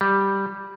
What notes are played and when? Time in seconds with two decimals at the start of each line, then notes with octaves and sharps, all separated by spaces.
0.01 G3